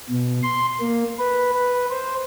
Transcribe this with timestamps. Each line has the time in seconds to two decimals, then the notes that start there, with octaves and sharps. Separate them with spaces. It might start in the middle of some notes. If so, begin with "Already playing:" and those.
0.10 B2
0.43 C6
0.80 A#3
1.19 B4
1.54 B4
1.91 C5